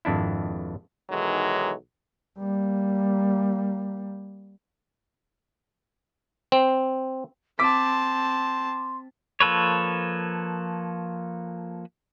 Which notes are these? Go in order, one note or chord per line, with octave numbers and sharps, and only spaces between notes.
G#1 F2 D4 E4
B1 D#3 E3 F#3 G#3
G3 A#3
C4
C4 A5 C6 D6 B6
F3 A#3 A4 B4 C#5